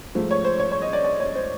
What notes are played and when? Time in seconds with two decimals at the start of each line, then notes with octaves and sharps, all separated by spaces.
0.15 G#2 F3 A3
0.31 C#5
0.45 C5
0.60 C#5
0.72 C#5
0.82 D#5
0.93 D5
1.04 D5
1.20 C#5
1.35 C5